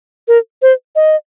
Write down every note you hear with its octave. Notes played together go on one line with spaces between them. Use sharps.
A#4
C5
D#5